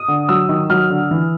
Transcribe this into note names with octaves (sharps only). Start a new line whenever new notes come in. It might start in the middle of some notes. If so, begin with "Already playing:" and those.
Already playing: D#6
D3
F#3 E6
D#3
F#3 F6
D3
E3